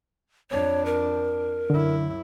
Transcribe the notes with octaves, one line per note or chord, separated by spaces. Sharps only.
F2 D4 C#5
A#4
F#2 D3 E4